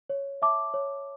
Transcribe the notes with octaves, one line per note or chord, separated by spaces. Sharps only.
C#5
E5 A5 D6
C#5